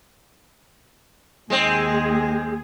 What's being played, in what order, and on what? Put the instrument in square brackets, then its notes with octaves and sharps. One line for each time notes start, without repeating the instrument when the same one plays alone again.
[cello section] D#2 G#4 [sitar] G#3 C4